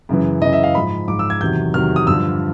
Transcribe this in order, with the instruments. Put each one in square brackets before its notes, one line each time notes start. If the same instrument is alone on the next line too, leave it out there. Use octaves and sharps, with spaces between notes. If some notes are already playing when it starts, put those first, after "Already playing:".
[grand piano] F#2 C#3 E3
F#2 C#3 E3 D#5
E5
F5
G#2 F3 B5
G#2 F3 D6
E6
G#6
E2 C3 D#3 F#3 G6
E2 C3 D#3 F#3 F6
D#6
G2 D3 F3 E6